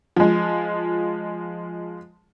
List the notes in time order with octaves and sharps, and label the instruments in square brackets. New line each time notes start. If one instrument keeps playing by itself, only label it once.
[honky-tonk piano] F3 G#3